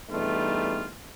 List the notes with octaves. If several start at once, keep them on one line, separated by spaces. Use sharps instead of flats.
E2 G2 G3 A3 D#4 F4